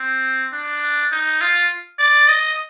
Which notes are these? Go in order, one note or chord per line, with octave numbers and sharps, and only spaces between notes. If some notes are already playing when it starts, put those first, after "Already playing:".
Already playing: C4
D4
D#4
F4
D5
D#5